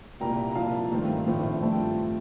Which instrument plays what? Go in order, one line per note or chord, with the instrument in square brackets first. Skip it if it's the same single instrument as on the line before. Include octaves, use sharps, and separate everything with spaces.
[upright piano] C2 A#2 G3 A#3 G5 A#5
A#5
C2 A#2 F3 A#3 F5 A5
G2 D#3 A3 C4
A#1 A2 F3 A3 C4
G2 F3 A3 C4 A5
G5